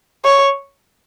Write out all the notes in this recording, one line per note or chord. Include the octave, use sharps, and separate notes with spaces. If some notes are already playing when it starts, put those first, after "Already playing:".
C#5